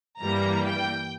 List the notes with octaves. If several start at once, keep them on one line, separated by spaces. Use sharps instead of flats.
G2 E3 G3 A#3 A#5
G5